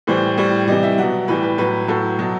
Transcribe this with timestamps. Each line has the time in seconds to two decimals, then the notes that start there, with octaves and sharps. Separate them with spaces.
0.07 A2 E3 G3 C5
0.37 A2 G3
0.68 C3 E3 G3 D#5
0.83 E5
0.98 B2 F#3 F#5
1.28 A2 E3 G3 B4
1.43 B4
1.58 A2 F#3 B4
1.88 A2 F#3 A4
2.19 B2 F#3